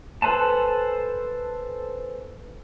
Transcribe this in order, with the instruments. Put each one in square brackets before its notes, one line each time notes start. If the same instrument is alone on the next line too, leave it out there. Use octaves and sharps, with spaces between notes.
[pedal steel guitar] A4 B4 C5 G#5 A5